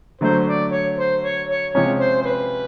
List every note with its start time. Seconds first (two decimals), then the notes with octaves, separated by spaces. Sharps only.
0.21 D3 F#3 A3 C5
0.47 D5
0.72 C#5
0.98 C5
1.24 C#5
1.49 C#5
1.75 C3 F3 G#3 C#4 C#5
2.00 C5
2.22 C5
2.25 B4